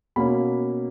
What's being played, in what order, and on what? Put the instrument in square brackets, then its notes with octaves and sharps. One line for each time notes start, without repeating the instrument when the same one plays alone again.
[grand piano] B2 A#3 C#4 B5